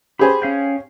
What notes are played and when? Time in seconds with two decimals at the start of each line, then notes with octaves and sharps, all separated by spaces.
0.19 G4 G#4 C5 B5
0.42 C#4 F5 G5